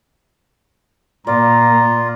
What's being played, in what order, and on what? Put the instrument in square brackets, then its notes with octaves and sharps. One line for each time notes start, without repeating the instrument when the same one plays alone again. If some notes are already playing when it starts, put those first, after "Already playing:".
[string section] A#2 [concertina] F4 [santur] D5 [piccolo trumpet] A#5